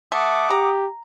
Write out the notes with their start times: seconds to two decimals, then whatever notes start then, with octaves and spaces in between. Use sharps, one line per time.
0.12 A3 F#5 D6 D#6
0.50 G4 A#5